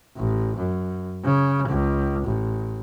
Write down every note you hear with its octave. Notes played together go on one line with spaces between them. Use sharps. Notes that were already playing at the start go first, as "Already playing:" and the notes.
A1
F#2
C#3
C#2
A1